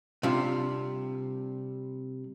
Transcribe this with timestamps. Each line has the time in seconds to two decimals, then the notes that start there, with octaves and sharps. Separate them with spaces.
0.23 C3 G3 D4 F4